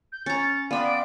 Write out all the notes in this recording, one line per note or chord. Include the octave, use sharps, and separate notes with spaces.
G6
C#4 A#5 A6 C#7
B3 D5 F5 G5 B5 C6 D#7
D7